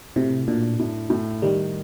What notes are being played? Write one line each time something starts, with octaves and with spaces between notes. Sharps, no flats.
A2 C3
A#2 D4
A2
A2
D#3 G3